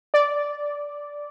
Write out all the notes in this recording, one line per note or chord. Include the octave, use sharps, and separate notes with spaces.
D5